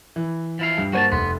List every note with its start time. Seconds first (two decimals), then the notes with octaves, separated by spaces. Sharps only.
0.16 E3
0.59 F3 E4 F5
0.78 G2
0.93 G2 A#3 F#4 C5 G#5 A5
1.12 F1 B3 C6